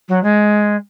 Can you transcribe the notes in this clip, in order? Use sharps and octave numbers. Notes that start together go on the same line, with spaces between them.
F#3
G#3